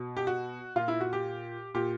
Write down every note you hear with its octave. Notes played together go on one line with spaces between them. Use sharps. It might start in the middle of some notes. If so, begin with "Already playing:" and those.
Already playing: B2
G4
F#4
A#2 F4
E4
F#4
G4
A#2 G4